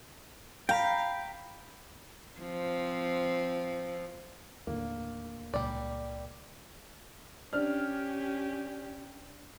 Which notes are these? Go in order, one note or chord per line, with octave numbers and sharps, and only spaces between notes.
F5 G5 A#5 B5
F3 C4
D#2 A2 D3 A#3
C#2 A#2 G3 D5
C#4 D4 G4 F6